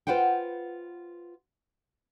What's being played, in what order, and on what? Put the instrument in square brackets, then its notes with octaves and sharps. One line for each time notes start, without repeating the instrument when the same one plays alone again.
[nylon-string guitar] F4 B4 C5 F#5 G5